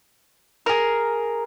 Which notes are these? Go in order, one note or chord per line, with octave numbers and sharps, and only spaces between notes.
G#4 A#4